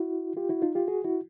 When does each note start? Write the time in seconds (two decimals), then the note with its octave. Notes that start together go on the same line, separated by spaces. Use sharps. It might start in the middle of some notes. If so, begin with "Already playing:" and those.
Already playing: E4 F#4
0.37 F4 G4
0.49 E4 F#4
0.62 D#4 F4
0.75 F4 G4
0.88 F#4 G#4
1.04 E4 F#4